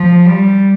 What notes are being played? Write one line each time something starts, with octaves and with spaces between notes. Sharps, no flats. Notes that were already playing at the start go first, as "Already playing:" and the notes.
Already playing: F3
G3